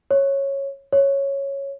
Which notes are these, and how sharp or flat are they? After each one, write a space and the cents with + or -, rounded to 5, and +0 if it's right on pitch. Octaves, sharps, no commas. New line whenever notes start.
C#5 -10
C#5 -5